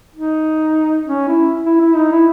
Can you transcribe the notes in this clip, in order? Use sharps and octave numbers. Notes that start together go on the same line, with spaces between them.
D#4
C#4
E4
E4
E4
D#4
E4